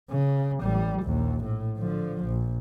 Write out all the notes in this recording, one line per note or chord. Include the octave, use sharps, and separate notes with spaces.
C#3
A1 G3
A#1 D#2
A2
D3 F3
A#1